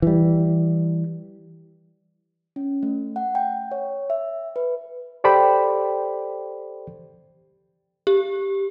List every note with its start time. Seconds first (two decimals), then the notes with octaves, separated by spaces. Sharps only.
0.02 E3 G3
2.56 C#4
2.83 A3
3.16 F#5
3.35 G5
3.71 C#5
4.10 E5
4.56 B4
5.24 G4 A4 C5 D5 G5 B5
8.07 G4